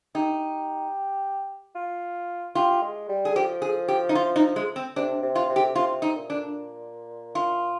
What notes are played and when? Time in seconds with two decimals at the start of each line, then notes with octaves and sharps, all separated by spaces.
0.15 D#4 G4
1.75 F4
2.55 F4 G4
2.82 G#3
3.09 G3
3.25 G#4
3.35 F3 G4
3.62 G#4
3.88 G4
4.09 D#4
4.15 F4
4.36 D#4
4.56 G#3
4.76 C4
4.96 C3 D4
5.23 C3
5.35 F4
5.49 C3
5.56 G4
5.75 C3 F4
6.02 D#4
6.16 A#2
6.30 D4
7.35 F4